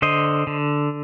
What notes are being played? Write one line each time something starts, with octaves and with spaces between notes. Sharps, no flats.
D3 C5 D#5
D3